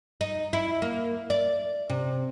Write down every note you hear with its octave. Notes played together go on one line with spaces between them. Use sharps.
D#4
E4
A#3
D5
C3